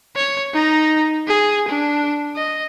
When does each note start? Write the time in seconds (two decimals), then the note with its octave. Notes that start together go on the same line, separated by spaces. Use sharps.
0.16 C#5
0.53 D#4 A#5
1.27 G#4
1.68 D4
2.36 D#5